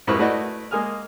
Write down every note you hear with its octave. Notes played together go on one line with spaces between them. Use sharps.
F2 G#2 E4 A#4 B4 C#6
A3 E4 F#4 B4 D5 D#5
G#3 A#3 G#5 D#6 F6